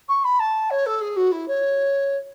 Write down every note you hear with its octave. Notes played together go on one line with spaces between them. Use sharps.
C#6
B5
A5
C#5
A4
G#4
F#4
E4
C#5